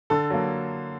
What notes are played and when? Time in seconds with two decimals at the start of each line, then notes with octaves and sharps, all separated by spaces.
0.10 D3 A4
0.30 F#3 A#3